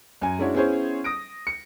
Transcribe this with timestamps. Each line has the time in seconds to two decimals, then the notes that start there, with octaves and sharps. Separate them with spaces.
0.21 F#2 G#5
0.39 G#3 C#4 D4 E4 F#4 C#5
0.54 B3 C#4 E4 G#4 C5 C#5
1.04 D#6 A#6 D7
1.47 C#7